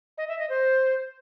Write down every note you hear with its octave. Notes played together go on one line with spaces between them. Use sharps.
D#5
E5
D#5
C5